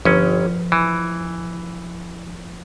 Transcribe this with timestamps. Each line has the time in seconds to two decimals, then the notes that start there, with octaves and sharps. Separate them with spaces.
0.05 G1 F3 C#4
0.72 E3